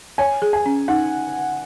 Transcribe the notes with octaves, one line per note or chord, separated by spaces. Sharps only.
C#5 G#5
G#4
G#5
C#4
D#4 F#5